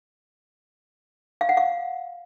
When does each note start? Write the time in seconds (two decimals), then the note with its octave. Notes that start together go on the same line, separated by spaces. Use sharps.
1.41 F5
1.49 F#5
1.57 F5